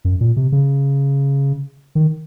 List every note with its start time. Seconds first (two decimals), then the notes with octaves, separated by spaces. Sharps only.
0.05 F#2
0.21 A#2
0.36 C3
0.52 C#3
1.95 D#3